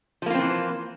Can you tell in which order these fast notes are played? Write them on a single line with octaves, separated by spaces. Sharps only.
F3 A#3 F4 C4 E3